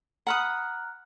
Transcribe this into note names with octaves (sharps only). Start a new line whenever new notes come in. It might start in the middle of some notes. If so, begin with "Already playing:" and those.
F#5 A#5 B5 D#6 F6 F#6